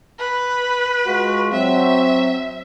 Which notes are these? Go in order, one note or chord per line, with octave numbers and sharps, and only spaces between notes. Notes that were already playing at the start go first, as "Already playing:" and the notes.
B4
G#3 F4 F#4
F#3 C4 E5